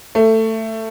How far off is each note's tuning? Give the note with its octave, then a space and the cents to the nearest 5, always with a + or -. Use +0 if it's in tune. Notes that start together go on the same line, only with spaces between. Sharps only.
A3 +15